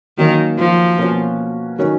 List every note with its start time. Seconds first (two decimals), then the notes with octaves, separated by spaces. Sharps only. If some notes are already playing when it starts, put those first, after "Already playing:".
0.18 D#3 F#3 A#3 C#4
0.58 F3
0.98 B2 A#3 C#4 F#4
1.79 D#3 F#3 C#4 F#4 A#4